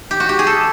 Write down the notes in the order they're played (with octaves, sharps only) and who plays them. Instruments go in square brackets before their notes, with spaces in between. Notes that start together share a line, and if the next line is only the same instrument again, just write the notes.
[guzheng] G4
F#4
G4
G#4
A4